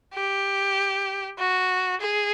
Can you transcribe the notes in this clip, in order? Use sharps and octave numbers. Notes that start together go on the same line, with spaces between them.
G4
F#4
G#4